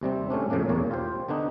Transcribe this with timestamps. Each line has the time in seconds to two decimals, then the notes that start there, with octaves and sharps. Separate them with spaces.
0.01 D#2 C3 G3 C4
0.30 A2 A3 C#4 D4
0.50 F2 A2 C#3 A#3 D4
0.69 B1 E2 A#3 C#5 D5
0.91 F4 G4 C5
1.28 D3 B3 D4 D#4